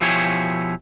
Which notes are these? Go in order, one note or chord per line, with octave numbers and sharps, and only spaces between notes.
B2 F3 E4 G4 C#5 G#5